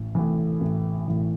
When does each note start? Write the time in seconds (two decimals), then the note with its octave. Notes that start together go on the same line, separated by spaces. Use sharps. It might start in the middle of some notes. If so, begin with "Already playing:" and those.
Already playing: A1
0.15 A2 E3
0.61 A1
1.08 A2 E3